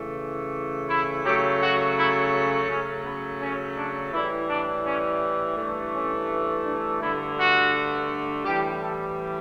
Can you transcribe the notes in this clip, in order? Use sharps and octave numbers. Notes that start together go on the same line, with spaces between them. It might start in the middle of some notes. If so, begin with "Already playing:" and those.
Already playing: C#3 E3 A3
E4
C#3 F#3 A3 G4
F#4
E4
C#4
C#3 F#3 A3 C#4
B3
C#4
D4
A2 E3 G3 E4
D4
C#4
G2 E3 A3
C#4
D4
G2 D3 A3 E4
F#4
A2 E3 G3 G4
A4